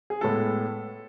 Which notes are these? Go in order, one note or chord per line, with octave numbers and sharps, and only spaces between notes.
G#4
A2 G#3 B3 A4